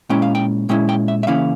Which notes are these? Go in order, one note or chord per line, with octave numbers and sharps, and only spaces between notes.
A#2 G#3 C#4 E4 G5
F5
G5
A#2 G#3 C#4 E4 G5
G5
E5
E5
C#3 E3 A#3 C#4 E4 F5